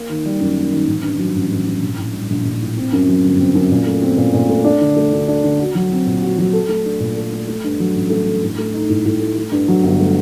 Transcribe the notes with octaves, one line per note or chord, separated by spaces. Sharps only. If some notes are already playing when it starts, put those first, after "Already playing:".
Already playing: A#3
D#3
G3
F#2
A#3
D#3
A1
G2
F#3
A1
A1
G2
A#1
A2
G3
A#1
A#1
A2
C4
F#2
F#3
G1
C4
F#2
A#2
A3
C4
A#2
A#2
A3
D4
D3
A3
D2
D4
D3
F#4
F#3
C4
A#2
F#4
F#3
A4
A3
D4
A#2
A4
A3
A3
G2
F#3
A1
A3
G2
A2
A3
D#4
A2
A2
A3
A3
G2
F#3
G1
A3